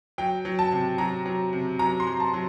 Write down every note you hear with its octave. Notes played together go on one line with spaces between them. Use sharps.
F#3 G5
F#3
A5
C3
F#3 A#5
F#3
C3
F#3 A#5
C6
F#3
A5
F#3